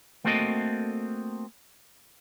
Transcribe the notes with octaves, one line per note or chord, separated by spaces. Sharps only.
A3 A#3 C4 F#4 A4 D#5